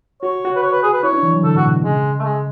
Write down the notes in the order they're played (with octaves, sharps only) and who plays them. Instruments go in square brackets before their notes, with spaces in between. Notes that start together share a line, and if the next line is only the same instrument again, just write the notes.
[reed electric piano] F#4 [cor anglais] C#5
[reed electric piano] F#4
[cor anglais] B4
C#5
B4
G#4
B4
[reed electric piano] E4 [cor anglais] C#5
[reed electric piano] D4
E3
F#3
[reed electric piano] D3 [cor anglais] A4
[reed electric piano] A2 [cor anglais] F#4
[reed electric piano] B2
B2
[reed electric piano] C#3 [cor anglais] G#3
[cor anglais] A3
G#3